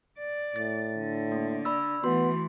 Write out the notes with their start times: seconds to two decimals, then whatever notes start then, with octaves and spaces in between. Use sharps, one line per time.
0.18 D5
0.56 A2 A6
0.98 D3
1.32 A#3
1.65 D5 B5 E6
2.04 E3 A3 B3 F#4 C6